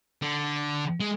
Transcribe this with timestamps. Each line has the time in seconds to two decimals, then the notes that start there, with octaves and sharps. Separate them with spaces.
0.22 D3
1.00 G#3